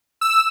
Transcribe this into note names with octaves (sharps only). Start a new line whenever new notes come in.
E6